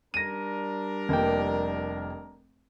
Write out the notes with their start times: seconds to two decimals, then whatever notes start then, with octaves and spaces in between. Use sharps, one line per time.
0.14 G3 D4 A#4 A#6 D#7
1.09 F1 A#3 G5